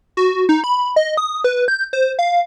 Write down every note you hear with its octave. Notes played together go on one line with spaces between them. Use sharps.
F#4
D#4
B5
D#5
D#6
B4
G6
C5
F5